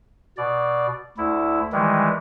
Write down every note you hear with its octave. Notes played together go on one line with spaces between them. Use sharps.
B2 D5
D2 E4
D#3 E3 G3 G#3